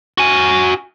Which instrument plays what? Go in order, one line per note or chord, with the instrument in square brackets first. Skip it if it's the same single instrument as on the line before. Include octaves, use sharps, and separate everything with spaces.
[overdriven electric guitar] F#4 G#5